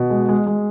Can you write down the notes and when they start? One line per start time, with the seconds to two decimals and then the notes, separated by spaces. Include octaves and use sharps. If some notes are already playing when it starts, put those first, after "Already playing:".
Already playing: B2
0.10 G#3
0.29 G#3
0.47 G#3